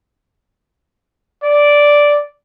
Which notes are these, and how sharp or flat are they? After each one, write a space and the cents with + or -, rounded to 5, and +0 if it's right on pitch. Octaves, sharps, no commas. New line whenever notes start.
D5 -5